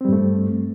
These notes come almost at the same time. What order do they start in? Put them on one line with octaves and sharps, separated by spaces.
C4 G3 G2 A3